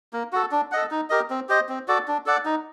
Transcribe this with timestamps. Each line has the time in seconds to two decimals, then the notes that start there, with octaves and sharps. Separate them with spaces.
0.13 A#3
0.33 F#4 A4
0.51 D4
0.72 A4 D#5 F#5
0.91 D#4
1.10 G4 A#4 D#5
1.30 C4
1.49 G4 C5 D#5
1.69 C4
1.88 F#4 A4 D5
2.08 D4
2.26 A4 D5 F#5
2.45 D#4